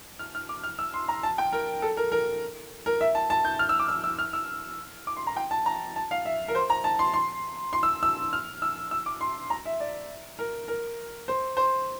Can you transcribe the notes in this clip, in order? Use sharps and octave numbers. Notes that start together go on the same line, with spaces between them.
F6
F6
D6
F6
E6
C6
A#5
A5
G5
A#4
A4
A#4
A#4
A#4
E5
A5
A5
G6
F6
E6
D6
E6
E6
F6
E6
D6
C6
A#5
G5
A5
A#5
A5
F5
E5
A#4
C5
A#5
A5
C6
C6
C6
E6
E6
F6
E6
E6
D6
C6
A#5
E5
D5
A#4
A#4
C5
C5